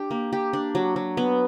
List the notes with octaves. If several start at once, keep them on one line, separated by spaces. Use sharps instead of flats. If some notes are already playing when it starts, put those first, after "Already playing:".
Already playing: D4 G4
A#3
G4
D4
F#3
F#3
B3